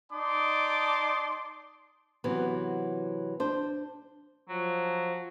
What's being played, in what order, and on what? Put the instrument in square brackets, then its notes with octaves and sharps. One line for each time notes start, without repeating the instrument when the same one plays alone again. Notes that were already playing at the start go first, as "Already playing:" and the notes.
[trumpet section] D#4 D5 A5 C6 D6 D#6
[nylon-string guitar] C3 E3 F#3 B3
D4 C5
[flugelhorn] F3 [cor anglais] F#3